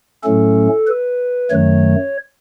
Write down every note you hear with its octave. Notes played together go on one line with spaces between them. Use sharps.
A2 F#3 A3 C#4 A4
B4
F#2 D#3 F#3 A3 C#5